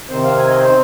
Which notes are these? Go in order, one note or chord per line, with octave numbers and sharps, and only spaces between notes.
C3 D#3 C4 C5
F5
G#5
D#5
C5
C4